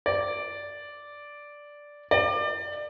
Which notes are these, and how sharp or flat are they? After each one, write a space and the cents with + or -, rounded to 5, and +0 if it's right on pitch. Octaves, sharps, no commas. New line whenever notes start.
D5 -5
D5 +25